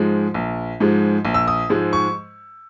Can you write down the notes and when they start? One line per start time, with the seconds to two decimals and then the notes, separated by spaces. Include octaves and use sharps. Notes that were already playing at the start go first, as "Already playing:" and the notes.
Already playing: G#2 F3 G#3
0.34 A#1
0.80 G#2 F3 G#3
1.25 A#1
1.34 E6
1.48 D#6
1.69 G#2 F3 G#3
1.93 C#6